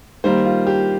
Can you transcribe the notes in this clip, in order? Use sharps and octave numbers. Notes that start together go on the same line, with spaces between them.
D#3 G3 A#3 C5
F4
G4